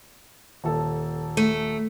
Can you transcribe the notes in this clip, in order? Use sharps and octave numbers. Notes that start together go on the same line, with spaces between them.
D#1 A4
A3